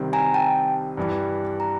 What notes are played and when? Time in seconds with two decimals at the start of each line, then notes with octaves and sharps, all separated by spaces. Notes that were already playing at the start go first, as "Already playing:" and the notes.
Already playing: C2 C3 D#3 G3 C4
0.13 G#5 A#5
0.34 G5 A5
0.97 G2 E3 G3
1.60 A#5